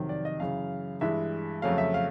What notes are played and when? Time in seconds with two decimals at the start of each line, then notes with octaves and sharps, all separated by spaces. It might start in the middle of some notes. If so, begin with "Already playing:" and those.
Already playing: F2 C3 D#3 F#3
0.09 D5
0.25 D#5
0.40 F#2 C#3 E3 F5
1.01 G2 E3 G#3 E5
1.62 F2 C#3 F#3 A3 F5
1.78 E5
1.94 F5